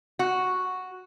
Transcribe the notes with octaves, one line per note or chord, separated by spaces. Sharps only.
F#4